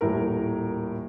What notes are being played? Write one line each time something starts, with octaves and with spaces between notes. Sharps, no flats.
D#1 A2 A#4